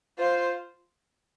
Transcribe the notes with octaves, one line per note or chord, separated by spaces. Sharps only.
F4 C5